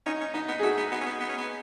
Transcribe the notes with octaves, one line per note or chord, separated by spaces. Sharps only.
C#4 D#4
C#4
B3 D#4
B3
G#4
A3 F#4
B3
B3
C#4
B3
B3
C#4
B3